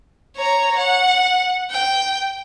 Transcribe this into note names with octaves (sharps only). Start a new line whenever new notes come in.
C#5 A#5
F#5
G5